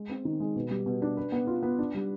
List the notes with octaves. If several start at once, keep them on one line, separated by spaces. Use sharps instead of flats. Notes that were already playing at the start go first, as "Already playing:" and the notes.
Already playing: G#3
C4
D#3
G#3
B2
G3
B2
D4
B4
B3
F4
B3
D4
G3